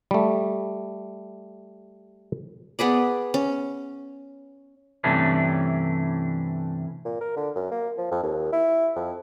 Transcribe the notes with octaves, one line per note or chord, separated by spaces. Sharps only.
G3 A3
B3 G#4 B4 D5
C#4
G2 C3 E3 A3 C#4 D4
A#2
A#4
D3
F#2
A#3
F3
F2
D#2
E4
F2